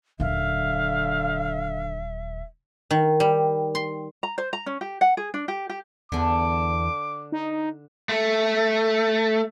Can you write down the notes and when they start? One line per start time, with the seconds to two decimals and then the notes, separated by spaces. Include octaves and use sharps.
0.20 D#1 D3 F#3 E5 F5
2.91 D#3
3.20 G3
3.75 C6
4.23 A#5
4.38 C5
4.53 A#5
4.66 C#4
4.81 G4
5.01 F#5
5.17 G#4
5.34 D4
5.48 G4
5.69 G4
6.12 E2 D3 D4 D6
7.32 D#4
8.09 A3